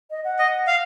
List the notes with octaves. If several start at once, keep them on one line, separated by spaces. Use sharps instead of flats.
D#5
F#5
D#5
F5